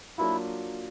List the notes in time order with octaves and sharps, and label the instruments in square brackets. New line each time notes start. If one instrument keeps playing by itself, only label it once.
[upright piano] F#3 A#3 D4 F4 [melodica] E4